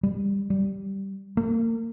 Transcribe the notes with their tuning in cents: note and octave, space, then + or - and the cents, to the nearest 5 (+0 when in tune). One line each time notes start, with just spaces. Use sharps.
G3 +25
G3 -5
A#3 -35